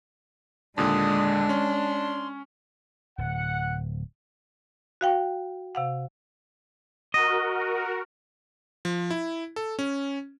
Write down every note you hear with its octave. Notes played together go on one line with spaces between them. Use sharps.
D#2 A#2 D3 G#3 D4 D#6
C#4 C6
D1 F#5
F#4 F5 G5
C3 F5 F#5
F#4 A#4 D#5
F3
E4
A4
C#4